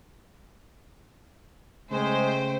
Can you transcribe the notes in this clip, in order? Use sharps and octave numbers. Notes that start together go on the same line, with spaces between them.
C#3 G#3 A3 C5 G5